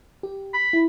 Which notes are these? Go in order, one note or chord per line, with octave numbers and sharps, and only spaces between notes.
G4
B5
E4